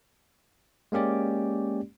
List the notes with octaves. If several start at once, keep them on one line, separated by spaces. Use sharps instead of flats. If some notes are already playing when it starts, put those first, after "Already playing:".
G#3 A#3 C#4 G4 D5